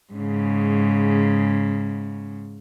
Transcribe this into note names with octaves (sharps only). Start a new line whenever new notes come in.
G#2 C#3